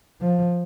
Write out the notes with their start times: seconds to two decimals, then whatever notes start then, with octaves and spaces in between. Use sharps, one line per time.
0.21 F3